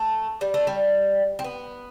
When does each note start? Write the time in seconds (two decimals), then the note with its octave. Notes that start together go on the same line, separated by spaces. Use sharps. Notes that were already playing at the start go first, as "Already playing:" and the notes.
Already playing: A3
0.41 G3
0.54 A3
0.67 G3
1.39 C4
1.44 B3